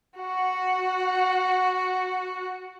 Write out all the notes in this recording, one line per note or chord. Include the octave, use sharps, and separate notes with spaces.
F#4 F#5